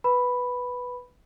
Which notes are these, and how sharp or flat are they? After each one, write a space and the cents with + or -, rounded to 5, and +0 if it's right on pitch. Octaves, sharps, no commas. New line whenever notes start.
B4 +0 B5 +0